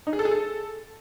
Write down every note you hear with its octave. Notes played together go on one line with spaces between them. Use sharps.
D#4
G#4
A4
G#4
A4